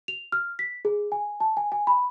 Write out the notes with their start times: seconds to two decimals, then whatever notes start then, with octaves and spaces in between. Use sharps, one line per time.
0.08 F7
0.32 F6
0.59 B6
0.85 G#4
1.12 G#5
1.40 A5
1.57 G#5
1.72 G#5
1.87 B5